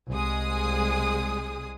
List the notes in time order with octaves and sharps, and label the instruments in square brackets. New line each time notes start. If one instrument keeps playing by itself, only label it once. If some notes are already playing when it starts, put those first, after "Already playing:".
[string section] C2 G#3 G#4 D#6